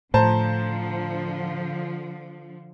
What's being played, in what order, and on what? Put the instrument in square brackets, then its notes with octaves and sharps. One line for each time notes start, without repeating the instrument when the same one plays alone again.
[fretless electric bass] A2 [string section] D3 F3 [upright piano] C5 A5 A#5